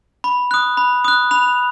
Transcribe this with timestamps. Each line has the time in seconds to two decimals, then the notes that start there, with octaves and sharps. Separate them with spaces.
0.24 B5
0.51 D#6 F#6
0.77 B5
1.04 D#6 F#6
1.31 B5 F7